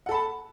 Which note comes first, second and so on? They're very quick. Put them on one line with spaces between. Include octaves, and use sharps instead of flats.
F#5 A4 B5 A5